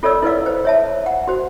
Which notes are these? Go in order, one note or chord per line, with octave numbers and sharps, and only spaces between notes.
F4 A4 C#5 D5 E6
E4 B4 D5 F5
C5
C#5 E5 A5
F#5
F#4 C5